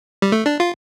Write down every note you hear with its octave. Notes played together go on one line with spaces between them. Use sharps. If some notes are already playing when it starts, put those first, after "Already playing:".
G3
A3
D4
F4